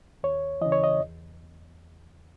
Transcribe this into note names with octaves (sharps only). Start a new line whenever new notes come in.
D#2 C#5
C#3 E3 D#5
C#5
D#5
E2